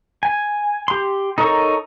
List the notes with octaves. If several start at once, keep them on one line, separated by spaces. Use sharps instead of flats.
G#5
G4 C6
D#4 A4 A#4 C#5 C#6